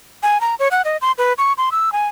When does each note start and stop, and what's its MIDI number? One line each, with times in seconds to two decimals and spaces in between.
0.23 0.41 80
0.41 0.55 82
0.59 0.68 73
0.71 0.82 78
0.85 0.97 75
1.02 1.12 84
1.18 1.33 71
1.38 1.53 85
1.58 1.70 84
1.72 1.92 88
1.92 2.08 80